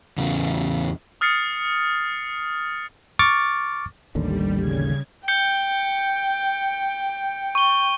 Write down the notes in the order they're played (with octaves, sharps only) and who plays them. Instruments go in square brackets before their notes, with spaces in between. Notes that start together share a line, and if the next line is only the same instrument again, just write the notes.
[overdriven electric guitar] E2 C#3
[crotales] D#6 F6 A6 C7 C#7
[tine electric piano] C#6 D6 F6 A6
[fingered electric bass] A1 D#2 D3 [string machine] G3
[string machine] C#3 G#6
[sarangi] G5 [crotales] G6 C#7 G7
[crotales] C#6 G7